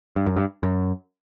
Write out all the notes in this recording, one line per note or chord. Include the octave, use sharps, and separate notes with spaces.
G2
F#2
G2
F#2